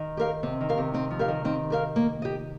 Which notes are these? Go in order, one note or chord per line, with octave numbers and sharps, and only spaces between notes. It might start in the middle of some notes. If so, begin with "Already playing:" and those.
Already playing: D#3
G4 A#4 F5
C3 C4
D#3
G4 A#4 F5
C3
D#3 C4
F3
G4 A#4 F5
D#3
D#3 C4
G4 A#4 F5
A#3
G4 D#5